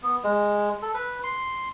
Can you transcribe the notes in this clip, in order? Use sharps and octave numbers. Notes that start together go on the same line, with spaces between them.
B3
G#3
A4
B4
C6